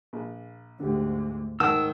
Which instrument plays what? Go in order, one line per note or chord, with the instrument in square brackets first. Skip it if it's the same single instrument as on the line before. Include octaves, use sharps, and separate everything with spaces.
[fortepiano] A#1
[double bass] D2 G#2 [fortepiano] D3 G4
[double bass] G#2 [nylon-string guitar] D#3 [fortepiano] F#5 A5 [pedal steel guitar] E6